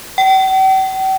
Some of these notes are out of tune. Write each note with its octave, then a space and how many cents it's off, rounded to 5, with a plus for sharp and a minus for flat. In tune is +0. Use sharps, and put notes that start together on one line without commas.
G5 -45